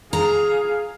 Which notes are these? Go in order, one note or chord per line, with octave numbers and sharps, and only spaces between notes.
G#4 F5 A#5